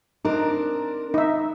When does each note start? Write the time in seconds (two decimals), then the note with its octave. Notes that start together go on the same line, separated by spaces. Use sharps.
0.25 C4 D4 D#4 A#4
1.14 D#4 E5